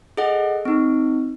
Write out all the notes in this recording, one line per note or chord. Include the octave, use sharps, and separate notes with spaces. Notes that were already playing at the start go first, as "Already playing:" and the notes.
G#4 A4 D#5 F#5
C4 D#4